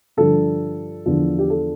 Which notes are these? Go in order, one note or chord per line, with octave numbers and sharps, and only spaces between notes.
G2 D3 F3 A4
E2 D3 F3
G4
A4